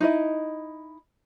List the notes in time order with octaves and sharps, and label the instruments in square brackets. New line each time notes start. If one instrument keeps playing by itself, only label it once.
[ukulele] D#4 E4 D#5